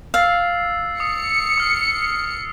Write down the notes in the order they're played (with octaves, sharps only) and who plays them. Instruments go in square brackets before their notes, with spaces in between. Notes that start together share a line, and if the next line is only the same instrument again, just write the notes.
[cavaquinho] F5 [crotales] E6 A6 C7
[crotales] D#6 [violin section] C#7
[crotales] D#6 F6 C7